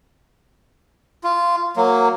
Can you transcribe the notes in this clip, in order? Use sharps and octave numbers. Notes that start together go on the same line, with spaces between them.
F4
F#3 A#3